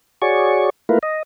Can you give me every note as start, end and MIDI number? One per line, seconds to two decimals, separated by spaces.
0.22 0.70 66
0.22 0.70 68
0.22 0.70 73
0.22 0.70 74
0.22 0.70 85
0.89 0.99 57
0.89 0.99 58
0.89 0.99 64
0.89 0.99 65
0.89 0.99 70
0.89 0.99 71
1.03 1.23 75